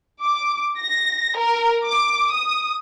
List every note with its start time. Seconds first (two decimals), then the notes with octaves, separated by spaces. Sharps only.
0.23 D6
0.79 A#6
1.38 A#4
1.85 D6
2.32 D#6